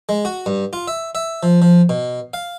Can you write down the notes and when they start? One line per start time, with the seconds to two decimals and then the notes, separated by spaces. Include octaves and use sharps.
0.09 G#3
0.25 F#4
0.46 G2
0.73 F4
0.88 E5
1.15 E5
1.43 F3
1.62 F3
1.89 B2
2.34 F5